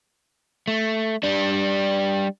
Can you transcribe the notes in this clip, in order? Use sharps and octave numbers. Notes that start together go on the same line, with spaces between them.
A3
G3 D4